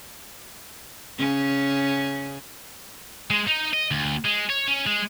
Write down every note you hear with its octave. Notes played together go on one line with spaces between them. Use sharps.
C#3 C#4
G#3
D#4
D#5
D2
G#3
C#5
C#4
G#3